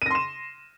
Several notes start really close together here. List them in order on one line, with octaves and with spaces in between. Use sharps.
D#7 A#6 C6 E7